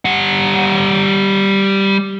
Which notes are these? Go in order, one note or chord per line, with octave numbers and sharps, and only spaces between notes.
G3 F#5